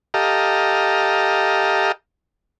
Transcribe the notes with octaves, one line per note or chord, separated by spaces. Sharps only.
G4 A4 D#5 F5 A#5